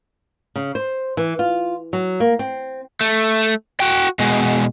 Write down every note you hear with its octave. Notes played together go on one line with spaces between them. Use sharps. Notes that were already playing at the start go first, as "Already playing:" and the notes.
C#3
C5
E3
F4
F#3
A#3
C4
A3
F#4 G5
B2 G#3